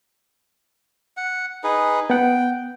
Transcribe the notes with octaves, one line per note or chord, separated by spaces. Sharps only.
F#5
D#4 G#4 B4
B3 F#5 G5